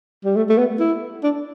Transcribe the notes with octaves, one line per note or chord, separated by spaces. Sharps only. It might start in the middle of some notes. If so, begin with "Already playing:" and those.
G3
A3
A3
B3
E4
D4